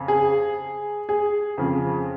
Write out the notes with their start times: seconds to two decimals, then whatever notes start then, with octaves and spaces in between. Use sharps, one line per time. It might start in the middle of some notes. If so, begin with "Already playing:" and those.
Already playing: F2 C#3
0.08 G#4
1.09 G#4
1.58 F2 C#3 F3